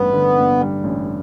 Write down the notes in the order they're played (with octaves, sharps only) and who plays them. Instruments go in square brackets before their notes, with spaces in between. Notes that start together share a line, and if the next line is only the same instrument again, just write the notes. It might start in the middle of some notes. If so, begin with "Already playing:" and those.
Already playing: [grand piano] A1 G2 G3 [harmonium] B3
[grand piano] D3
G2
G3
A1